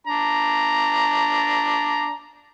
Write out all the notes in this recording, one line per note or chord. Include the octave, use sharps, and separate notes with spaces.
D4 A#5